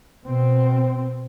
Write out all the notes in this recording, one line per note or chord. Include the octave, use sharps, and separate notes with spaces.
B2 C4